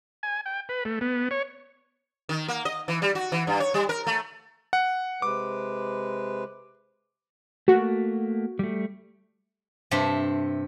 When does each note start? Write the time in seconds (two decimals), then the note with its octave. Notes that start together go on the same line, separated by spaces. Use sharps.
0.23 G#5
0.46 G5
0.69 B4
0.85 A3
1.01 B3
1.31 C#5
2.29 D#3
2.48 A#3
2.65 D#5
2.88 E3
3.02 G3
3.15 F#4
3.32 E3
3.47 G2
3.60 C#5
3.74 G3
3.89 A#4
4.07 A3
4.73 F#5
5.22 C3 G#3 B4 D6
7.68 A3 A#3 F#4
8.59 G3 A3
9.91 G2 C3 A4 E5